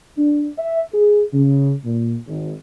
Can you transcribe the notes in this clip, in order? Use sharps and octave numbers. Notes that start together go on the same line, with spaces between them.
D4
E5
G#4
C#3
A#2
G#1